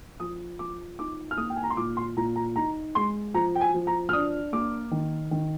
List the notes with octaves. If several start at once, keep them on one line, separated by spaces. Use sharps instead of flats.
F3 D#6
F3 D6
D#4 D6
F6
A#3 D#6
G5
G#5
A#5
C6
A#2 D6
C6
A#2 A#5
A#5
D#4 A#5
G#3 C6
F3 A#5
G5
G#5
F3
A#5
F6
D4 D#6
A#3 D6
D#3
D#3